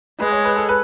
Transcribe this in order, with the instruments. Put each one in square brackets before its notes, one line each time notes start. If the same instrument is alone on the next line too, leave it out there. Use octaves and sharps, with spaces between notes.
[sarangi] G#3 [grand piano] B4
[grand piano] C#5
B4
A4
B4